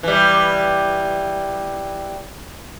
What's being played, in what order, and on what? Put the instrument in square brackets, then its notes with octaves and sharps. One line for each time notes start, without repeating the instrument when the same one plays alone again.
[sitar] E3 G3